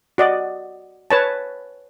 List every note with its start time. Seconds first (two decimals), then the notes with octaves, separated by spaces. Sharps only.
0.18 F#4 D5 D#5
1.11 B4 C#5 A5